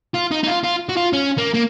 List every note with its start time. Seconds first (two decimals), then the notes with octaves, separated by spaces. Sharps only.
0.14 F4
0.31 D#4
0.43 D#4
0.47 F4
0.64 F4
0.89 F#4
0.97 F4
1.13 C#4
1.38 A#3
1.54 A#3